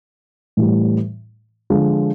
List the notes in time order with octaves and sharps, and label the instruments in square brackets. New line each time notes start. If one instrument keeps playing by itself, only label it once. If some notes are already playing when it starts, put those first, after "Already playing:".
[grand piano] A2 E3 G3
D3 F3 G#3